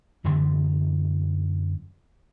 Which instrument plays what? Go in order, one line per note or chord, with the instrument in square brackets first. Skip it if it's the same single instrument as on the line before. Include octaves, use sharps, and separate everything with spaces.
[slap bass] F#2 D3 E3 G3